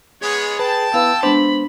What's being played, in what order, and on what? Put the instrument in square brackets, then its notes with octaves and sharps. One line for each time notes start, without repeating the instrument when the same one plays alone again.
[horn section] G#3 B3 C#5 [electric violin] G#4
[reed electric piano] B4 [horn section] G5 A5
[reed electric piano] B3 E4 B4 [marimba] F5 [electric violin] E6
[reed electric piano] G#3 B3 C5 [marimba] D4 [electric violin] B5